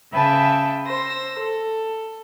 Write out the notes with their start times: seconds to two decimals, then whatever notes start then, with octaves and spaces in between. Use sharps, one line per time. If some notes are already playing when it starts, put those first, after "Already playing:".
0.13 C#3 B4 E5 G5 A5
0.87 C5 E6 A#6
1.40 A4